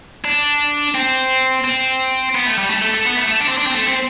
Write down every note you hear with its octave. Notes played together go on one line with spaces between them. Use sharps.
D4
C4
C4
B3
A3
G3
A3
A3
A3
B3
A3
A3
D4
C4
D4
C4
A3
C4